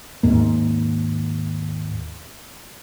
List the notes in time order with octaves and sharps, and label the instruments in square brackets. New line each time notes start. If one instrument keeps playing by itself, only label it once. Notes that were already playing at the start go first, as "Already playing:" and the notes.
[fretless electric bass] D#2 G#2 A#3